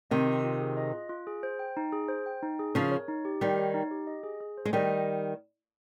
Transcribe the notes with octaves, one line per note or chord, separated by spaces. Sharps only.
C3 D#3 D#5
F4
F4
G#4
D#5
F4
F4
G#4
C5
G5
D#4
G#4
C5
G5
D#4
G#4
C#3 F3 A#4
C#5
D#4
G4
D#3 G3 A#4
C#5
D#4
G4
D#5
G#4
G#4
C5
G#3
D#3 G3 D#5